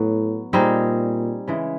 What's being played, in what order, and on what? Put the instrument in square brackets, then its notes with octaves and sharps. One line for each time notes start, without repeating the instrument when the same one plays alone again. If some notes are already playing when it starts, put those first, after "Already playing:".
Already playing: [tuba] A2 [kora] F#3 B3
[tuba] A#2 [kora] G3 C4 D#4 G#4
[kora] C#3 E3 G#3